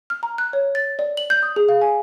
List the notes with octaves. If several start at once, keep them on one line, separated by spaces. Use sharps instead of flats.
F6
A#5
F#6
C#5
A6
D5
F#7
G6
D#6
G#4
F5
G#5